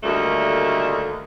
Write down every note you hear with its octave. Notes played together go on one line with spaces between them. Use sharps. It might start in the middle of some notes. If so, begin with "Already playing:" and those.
D2 D#3 G3 A3 A#3